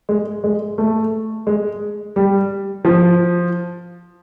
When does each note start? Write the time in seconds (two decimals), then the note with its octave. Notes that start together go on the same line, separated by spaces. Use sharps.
0.09 G#3
0.44 G#3
0.78 A3
1.47 G#3
2.16 G3
2.85 F3